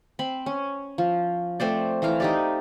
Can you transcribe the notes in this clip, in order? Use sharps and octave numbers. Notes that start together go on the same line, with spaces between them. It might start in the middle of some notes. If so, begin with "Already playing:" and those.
C4 B5
C#4
F3
A3 C4 C5 D5
E3 A3 F5 A#5
D#4 G4 D5